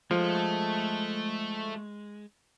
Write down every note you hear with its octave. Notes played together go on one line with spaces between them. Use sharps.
F3 G#3 A3 A4